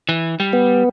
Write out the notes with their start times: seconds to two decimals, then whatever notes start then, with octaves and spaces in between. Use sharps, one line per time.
0.09 E3
0.40 G3
0.53 B3